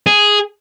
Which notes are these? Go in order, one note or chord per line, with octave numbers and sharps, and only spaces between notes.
G#4